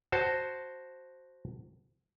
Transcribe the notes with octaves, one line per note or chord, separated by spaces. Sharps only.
F#4 C5 A5